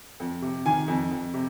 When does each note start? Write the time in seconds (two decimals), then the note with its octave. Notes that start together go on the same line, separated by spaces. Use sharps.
0.20 F2
0.42 C3
0.66 D#3 G#5
0.88 F2
1.11 F2
1.34 C3